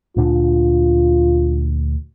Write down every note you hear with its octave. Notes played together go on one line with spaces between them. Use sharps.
D2 A#2 D4 F4